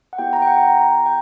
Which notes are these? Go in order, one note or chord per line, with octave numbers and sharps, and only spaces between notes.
F#5
B3 E4 G4 G5
A#5
G5
F#5
G5
A#5
A#5
G5